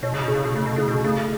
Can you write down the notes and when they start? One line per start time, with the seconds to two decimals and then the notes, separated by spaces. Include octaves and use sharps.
0.03 B2 C#5
0.14 C#3
0.23 B2 G#4
0.34 C#3
0.45 B2
0.53 C#3 A3
0.66 B2
0.76 C#3 G#4
0.88 B2
1.04 C#3 A3